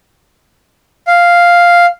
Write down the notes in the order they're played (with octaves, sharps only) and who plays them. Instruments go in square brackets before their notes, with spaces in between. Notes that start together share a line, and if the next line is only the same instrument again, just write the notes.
[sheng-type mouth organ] F5